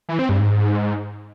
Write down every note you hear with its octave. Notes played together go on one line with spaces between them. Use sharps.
E3
C4
G2
G#2